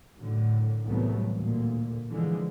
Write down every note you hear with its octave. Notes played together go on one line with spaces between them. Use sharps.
F#2 A2 D3
C2 A2 E3 F#3 A3 B3
D2 A#2
D3 E3 F3 G#3